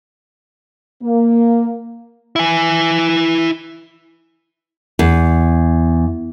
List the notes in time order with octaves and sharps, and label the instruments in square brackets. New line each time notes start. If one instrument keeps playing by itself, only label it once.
[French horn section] A#3
[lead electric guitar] E4 G#5
[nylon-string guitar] E2